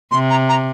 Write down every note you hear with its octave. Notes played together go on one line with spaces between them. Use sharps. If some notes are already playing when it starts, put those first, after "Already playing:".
C3 C6
A#5
A#5